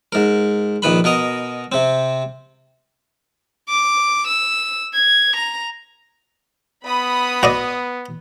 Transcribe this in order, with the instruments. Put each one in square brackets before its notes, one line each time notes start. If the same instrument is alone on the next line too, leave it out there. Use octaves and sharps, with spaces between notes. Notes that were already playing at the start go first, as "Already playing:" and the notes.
[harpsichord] G#2 A#4
A#1 D#3 B4 B5
B2 A#4 D#5 A#5
C3 C4
[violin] D6
E6
G#6
A#5
[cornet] B3 [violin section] B5 D#6
[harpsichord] F#4 D5 D#5